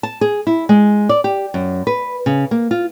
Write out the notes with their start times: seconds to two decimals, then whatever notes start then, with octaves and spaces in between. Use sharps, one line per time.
0.03 A5
0.21 G#4
0.47 E4
0.69 G#3
1.09 D5
1.24 G4
1.54 F#2
1.87 B4
2.26 C#3
2.51 A#3
2.71 F4